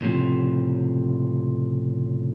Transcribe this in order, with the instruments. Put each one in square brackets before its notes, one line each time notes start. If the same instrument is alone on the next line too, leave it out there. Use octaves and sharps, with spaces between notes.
[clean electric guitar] C#2 A2 C3 F3